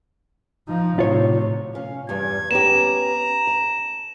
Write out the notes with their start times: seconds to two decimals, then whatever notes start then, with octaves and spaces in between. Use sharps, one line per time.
0.68 F3 D#4
0.99 A2 C3 F4 C#5
1.75 C#4 F5
2.09 E2 G2 G3 G#6
2.51 B3 C#4 G4 A#5 E7
3.47 A5